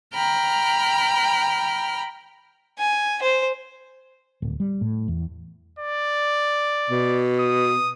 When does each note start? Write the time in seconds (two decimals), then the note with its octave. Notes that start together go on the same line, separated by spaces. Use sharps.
0.14 G5 A#5 B5 F6
2.78 G#5
3.22 C5
4.42 D1
4.60 G3
4.81 A2
5.08 E2
5.79 D5
6.90 B2
7.39 D#6